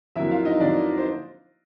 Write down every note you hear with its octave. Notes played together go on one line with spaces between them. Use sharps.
F2 D3 F#3 A#3 E4 E5
F4 F5
D#4 D#5
F2 D3 F#3 A#3 D4 D5
C5